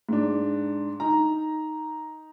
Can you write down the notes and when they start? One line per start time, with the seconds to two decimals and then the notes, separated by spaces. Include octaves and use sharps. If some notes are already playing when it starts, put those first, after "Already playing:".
0.09 G#2 D4
1.00 D#4 A#5